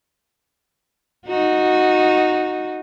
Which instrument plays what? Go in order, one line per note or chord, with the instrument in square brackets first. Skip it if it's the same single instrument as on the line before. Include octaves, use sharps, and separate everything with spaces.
[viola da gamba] D#4 F#4